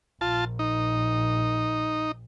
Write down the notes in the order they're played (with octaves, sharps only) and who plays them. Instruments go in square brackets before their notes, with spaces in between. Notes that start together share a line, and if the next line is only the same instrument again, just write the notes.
[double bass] A#1 [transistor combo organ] F4 A5
[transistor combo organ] D#4